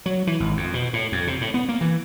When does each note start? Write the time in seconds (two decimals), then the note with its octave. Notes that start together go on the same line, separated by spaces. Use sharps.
0.06 F#3
0.27 E3
0.40 G#1
0.57 F2
0.74 B2
0.93 A2
1.12 F2
1.27 C3
1.41 A2
1.54 B3
1.69 A#3
1.81 E3